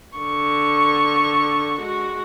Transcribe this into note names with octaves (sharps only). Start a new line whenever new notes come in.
D3 C#6
G#3 F#4